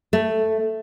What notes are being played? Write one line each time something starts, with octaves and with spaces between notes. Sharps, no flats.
A3